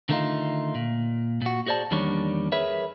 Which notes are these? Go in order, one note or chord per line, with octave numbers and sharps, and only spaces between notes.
D3 D#3 A3 C#4 D#4 F4
A#2
A#2 F#4
F#4 G#4 C5 D5 A5
E2 D#3 G3 A#3 D4 C#5
G#4 A#4 B4 C#5 E5